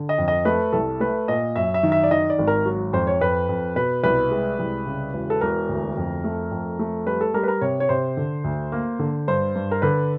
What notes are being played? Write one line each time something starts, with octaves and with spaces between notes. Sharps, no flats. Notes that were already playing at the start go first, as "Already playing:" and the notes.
Already playing: D3
D#5
F2
D#5
A3 B4
C2 A4
A3 B4
A#2 D#5
F#2 E5
E5
D#3
E5
D5
D#3 D#5
D5
G#1
A#4
F#3
F2 C5
C#5
F2 B4
F2
B2 B4
C2 B4
G#3
C2
C#3
E1
A4
E1 A#4
D2
F2
A3
F2
A3
G3 B4
A4
G3 A#4
B4
A#4
C3 C#5
C#5
C3 C5
D3
D2
A#3
D3
G2 C5
G2
A#4
D3 B4